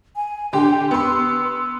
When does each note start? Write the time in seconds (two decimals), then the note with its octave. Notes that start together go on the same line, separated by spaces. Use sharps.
0.16 G#5
0.53 D3 G4 C6
0.91 B3 C6 E6